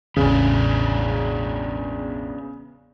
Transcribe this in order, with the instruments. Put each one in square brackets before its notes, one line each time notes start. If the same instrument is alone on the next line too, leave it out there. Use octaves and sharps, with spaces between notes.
[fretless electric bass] E1 A1 [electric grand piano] C#3 [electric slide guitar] B3 D4 G#4